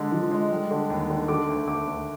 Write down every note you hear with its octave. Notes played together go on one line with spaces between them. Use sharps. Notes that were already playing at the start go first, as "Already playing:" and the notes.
Already playing: D3 G#3
F3
G#3
G3
D3
D#2
D3
D3 D6
D2
D2 D6
D2